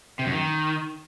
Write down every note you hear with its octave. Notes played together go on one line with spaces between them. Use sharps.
C3
F#2
D#3